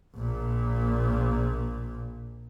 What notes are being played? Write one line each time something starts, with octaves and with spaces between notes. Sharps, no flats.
A#1 A#2